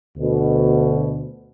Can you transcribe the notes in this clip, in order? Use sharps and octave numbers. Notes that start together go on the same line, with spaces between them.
D2 B2